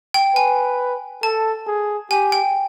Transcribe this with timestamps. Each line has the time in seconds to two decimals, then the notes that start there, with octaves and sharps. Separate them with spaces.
0.14 G5
0.35 B4 G#5
1.23 A4 A5
1.67 G#4
2.10 G4 G#5
2.32 G5